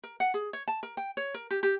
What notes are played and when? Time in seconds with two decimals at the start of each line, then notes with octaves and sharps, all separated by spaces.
0.04 A#4
0.20 F#5
0.34 G#4
0.53 C#5
0.68 A5
0.83 A#4
0.97 G5
1.17 C#5
1.34 A#4
1.51 G4
1.63 G4